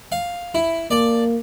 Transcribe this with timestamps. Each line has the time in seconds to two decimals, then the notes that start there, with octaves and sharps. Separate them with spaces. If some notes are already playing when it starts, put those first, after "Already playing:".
0.12 F5
0.54 E4
0.91 A#3 D5 A5